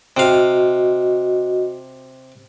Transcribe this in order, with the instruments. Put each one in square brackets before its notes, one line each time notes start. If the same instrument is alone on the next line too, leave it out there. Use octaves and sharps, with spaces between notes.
[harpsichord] C3 F5 [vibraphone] F#4 D#5